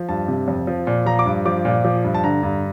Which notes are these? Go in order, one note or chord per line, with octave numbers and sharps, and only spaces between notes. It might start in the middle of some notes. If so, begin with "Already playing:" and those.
Already playing: F3
G2 A5
C3
F2
F3
A#2
F3 A#5
D6
G2
F3 D6
A#2
F3
G2
A5
D3 A#5
G2